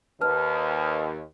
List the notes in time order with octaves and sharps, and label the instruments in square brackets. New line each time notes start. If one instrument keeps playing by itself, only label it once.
[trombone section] D#2 [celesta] B4 A5 F6